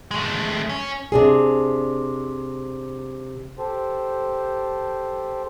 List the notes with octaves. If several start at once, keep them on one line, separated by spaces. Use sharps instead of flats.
G#3 A3
C#4
C3 D4 G#4
G4 A4 C5